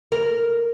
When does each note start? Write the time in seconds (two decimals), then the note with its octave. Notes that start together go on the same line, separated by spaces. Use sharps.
0.12 A#4